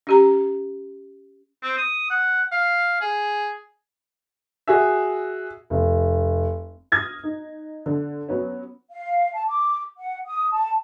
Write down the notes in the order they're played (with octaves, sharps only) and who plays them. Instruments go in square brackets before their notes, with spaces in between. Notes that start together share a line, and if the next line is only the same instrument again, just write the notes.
[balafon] C#4 G4 A#5
[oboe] C4
D#6
F#5
F5
G#4
[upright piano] F#4 G#4 E5
[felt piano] F1
[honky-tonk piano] D#6 F6 G#6 A#6
D#4
D3
F#3 B3 C#4
[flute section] F5
A5
D6
F#5
D#6
A5